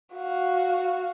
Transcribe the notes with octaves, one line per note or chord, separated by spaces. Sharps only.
F#4 F5